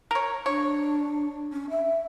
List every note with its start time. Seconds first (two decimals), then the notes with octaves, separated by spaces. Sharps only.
0.11 A#4 C#5
0.46 D4 C#5
1.52 C#4
1.70 E5